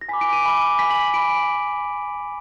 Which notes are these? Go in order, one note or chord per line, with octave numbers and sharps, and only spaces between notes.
A#6
G#5 B5 D6 B6
D7
D#7
G#5 B5 D6
G#5 B5 D6 B6
F#7
G#5 B5 D6 D7